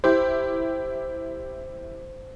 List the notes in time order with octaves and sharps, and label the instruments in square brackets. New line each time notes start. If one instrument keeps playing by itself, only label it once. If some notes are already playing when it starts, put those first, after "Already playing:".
[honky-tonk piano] E4 G4 [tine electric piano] C5